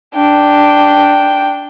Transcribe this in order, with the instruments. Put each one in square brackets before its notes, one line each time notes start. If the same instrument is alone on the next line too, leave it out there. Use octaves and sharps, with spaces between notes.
[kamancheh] D4 G5